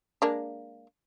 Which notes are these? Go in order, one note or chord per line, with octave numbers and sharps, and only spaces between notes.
G#3 A#3 D4